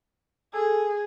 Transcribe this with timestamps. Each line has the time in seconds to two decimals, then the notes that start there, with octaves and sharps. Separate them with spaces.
0.53 G#4 A4